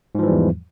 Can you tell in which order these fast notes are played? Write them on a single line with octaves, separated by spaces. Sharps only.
G#2 F3 E3 G3 E2